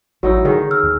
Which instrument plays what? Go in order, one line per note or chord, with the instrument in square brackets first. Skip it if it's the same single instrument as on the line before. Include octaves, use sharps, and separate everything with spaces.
[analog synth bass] A1 [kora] F#3 D#4 E4 [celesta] F#4
[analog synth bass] D3 [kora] D#3 G#4
[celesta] E6 F6
[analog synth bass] E2